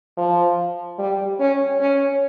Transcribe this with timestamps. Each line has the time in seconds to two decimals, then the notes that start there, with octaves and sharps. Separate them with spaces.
0.17 F3
0.99 G3
1.40 C#4
1.80 C#4